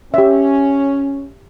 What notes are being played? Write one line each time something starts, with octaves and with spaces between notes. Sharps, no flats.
C#4 G4 E5